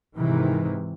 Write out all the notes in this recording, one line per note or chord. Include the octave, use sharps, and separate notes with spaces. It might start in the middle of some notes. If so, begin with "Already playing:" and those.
G#2 C3 D#3 E3